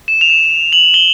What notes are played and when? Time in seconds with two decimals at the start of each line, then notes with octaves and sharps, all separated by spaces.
0.08 E7
0.21 F7
0.30 E7
0.73 F#7
0.94 G7